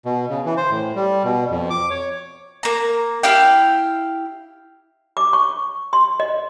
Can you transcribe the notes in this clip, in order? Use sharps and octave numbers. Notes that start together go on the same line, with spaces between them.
B2
C#3
E3
C5
A2
G3
B2
F2
D6
C#5
A#3 A#5
E4 G4 F5 G5
D6
C#6
C6
D#5